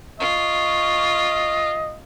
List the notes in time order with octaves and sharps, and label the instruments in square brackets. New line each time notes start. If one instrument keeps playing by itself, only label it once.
[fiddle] F4 [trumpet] D#5 [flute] C#6